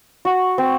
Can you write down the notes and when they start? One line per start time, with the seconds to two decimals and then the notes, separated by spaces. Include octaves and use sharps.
0.25 F#4
0.58 C4